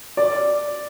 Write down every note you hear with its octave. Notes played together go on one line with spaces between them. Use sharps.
D5